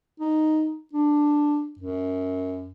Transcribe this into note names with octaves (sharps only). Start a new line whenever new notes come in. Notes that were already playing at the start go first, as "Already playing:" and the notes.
D#4
D4
F#2